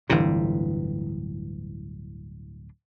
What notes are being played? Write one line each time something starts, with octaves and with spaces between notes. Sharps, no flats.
D1 G1 C3 E3 D4